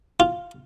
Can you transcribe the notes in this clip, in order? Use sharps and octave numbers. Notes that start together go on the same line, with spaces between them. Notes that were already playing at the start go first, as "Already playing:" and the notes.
F4